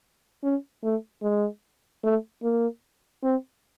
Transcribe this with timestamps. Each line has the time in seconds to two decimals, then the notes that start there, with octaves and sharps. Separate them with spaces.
0.43 C#4
0.83 A3
1.22 G#3
2.03 A3
2.43 A#3
3.23 C4